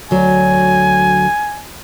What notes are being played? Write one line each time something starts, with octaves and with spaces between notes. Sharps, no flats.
D2 F#3 G#5